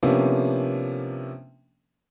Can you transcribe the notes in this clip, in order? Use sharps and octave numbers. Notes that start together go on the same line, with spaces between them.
C3 F3 A#3 B3 C#4 D4